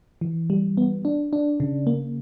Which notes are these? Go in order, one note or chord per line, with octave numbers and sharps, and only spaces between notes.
E3
G3
B3
D4
D4
C#3
A#3